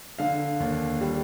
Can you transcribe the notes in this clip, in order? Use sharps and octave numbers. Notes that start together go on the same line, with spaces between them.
D3 F5
D#2
G3